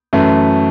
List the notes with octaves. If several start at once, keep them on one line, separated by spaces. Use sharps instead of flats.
F#2 E3 A3